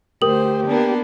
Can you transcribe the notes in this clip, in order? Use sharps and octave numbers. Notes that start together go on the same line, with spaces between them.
D2 G4 A#4 C5 D#6 F#7
A#3 B3 D4